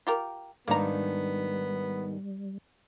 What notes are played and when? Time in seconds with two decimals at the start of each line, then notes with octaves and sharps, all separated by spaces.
0.07 F4 G4 A#4
0.68 G#2 D#3 G3 A#3 B3 D4 A#5